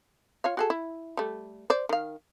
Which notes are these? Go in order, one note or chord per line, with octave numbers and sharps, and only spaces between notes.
F4 C#5 F5
F#4 G#4 A4
E4
G3 A3
C5 D5
D#3 F5